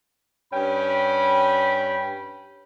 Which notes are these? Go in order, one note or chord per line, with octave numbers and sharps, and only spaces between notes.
G2 C#4 G5 B5